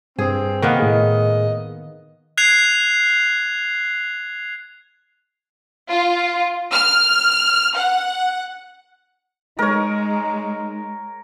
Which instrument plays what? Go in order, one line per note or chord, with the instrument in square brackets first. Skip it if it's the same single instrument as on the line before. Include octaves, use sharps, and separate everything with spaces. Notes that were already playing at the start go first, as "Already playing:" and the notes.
[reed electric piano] G2 [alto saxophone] C4 [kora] G#4
[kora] D#3 A#3 B3
[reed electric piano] A2 G#4 [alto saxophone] D#5
[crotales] F#6 G#6 C7 F7
[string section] F4
F6
F#5
[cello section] G#3 [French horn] D#4 [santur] A#4 C#5